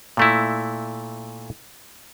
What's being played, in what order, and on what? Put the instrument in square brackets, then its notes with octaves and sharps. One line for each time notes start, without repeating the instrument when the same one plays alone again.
[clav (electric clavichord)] A#2 A3 E4